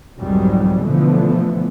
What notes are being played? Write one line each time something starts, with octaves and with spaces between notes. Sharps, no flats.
C2 F2 G#2 D#3 F#3 G3
B2 D3 E3 F3 A3 B3